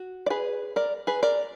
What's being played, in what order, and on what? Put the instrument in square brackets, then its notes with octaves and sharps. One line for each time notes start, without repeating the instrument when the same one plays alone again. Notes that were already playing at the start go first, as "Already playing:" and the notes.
Already playing: [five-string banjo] F#4
D5
G#4 B4
A#4 D5
G#4 B4
A#4 D5